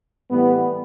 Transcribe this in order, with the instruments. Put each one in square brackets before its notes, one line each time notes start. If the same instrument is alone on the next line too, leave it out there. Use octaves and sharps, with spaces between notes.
[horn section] A2 E3 G3 B3